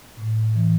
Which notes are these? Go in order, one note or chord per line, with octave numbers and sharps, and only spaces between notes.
A2
E3